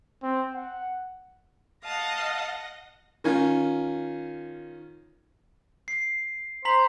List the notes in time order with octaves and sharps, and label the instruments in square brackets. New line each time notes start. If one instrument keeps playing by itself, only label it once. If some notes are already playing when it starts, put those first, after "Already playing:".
[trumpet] C4
F#5
[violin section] D#5 F#5 A#6 [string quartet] F5 A5 D#6
[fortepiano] D#3 C#4 F4
[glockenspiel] C7
[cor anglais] C5 [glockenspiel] A#5 B6 F#7